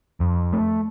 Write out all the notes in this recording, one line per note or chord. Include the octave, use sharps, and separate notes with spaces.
F2
A3